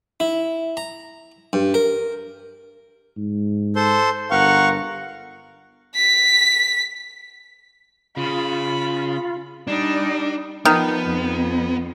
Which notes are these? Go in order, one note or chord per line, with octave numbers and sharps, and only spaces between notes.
E4
A#5
G2
A#4
G#2
A4 C5 C6
G1 A#4 F5 F#5 C#6
B6
C#3 F4 B5
G3 D4 D#4
D#3 F3 B3
F2